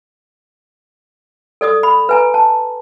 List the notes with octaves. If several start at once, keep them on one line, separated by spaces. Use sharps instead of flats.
A4 D5 D6 D#6
B5
B4 G#5 A#5
A5